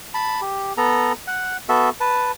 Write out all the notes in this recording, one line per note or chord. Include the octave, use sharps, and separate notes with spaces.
A5 B5
G4
B3 A4 A#5
F#5
B3 F#4 A4 E5
B4 A5